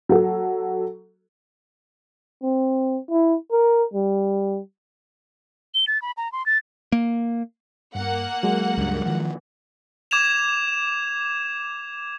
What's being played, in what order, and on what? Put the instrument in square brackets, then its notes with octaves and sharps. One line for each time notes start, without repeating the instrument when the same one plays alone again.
[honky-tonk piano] F#3 A4
[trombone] C4
E4
A#4
G3
[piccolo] G7
A6
B5
A#5
C6
A6
[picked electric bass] A#3
[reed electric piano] G2 [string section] A#3 F#5
[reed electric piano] F#3 G#3
[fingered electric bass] C#2 G2
D#3 F3
[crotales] D6 G#6 E7 F7